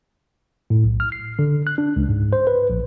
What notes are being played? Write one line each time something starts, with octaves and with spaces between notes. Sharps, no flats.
A2
B1
F6
C7
D3
F#6
D4
C#2
G#2
C5
B4
A#1